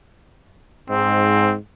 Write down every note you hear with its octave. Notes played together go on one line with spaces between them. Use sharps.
G#2 C4